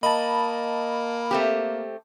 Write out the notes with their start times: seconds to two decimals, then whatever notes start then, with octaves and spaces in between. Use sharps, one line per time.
0.03 A#3 D#5 A5 B5
1.31 A3 C4 G4